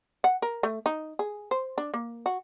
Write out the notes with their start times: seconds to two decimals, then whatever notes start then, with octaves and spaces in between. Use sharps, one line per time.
0.24 F#5
0.42 A#4
0.63 A3
0.86 D#4
1.19 G#4
1.51 C5
1.78 D4
1.94 A#3
2.26 F#4